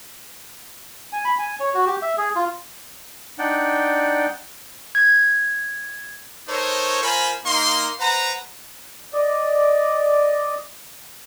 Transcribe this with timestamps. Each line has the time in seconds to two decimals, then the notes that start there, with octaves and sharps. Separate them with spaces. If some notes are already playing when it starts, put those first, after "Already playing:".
1.13 G#5
1.25 B5
1.39 G#5
1.60 C#5
1.74 F#4
1.86 G4
2.02 E5
2.17 G#4
2.36 F4
3.39 D4 D#4 D5 F#5 G5
4.95 G#6
6.48 D#4 A4 A#4 C5 C#5
7.02 F4 A#4 C5 G#5 A#5 B5
7.45 A#3 D#4 C6
7.99 B4 C5 F#5 A#5
9.14 D5 D#5